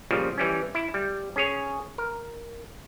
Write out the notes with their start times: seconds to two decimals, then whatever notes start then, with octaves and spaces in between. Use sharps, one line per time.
0.11 A#2 C#3 F3 G3
0.38 E3 G3 C#4
0.75 E4
0.94 G3
1.36 C#4 G#4 C#5
1.98 A#4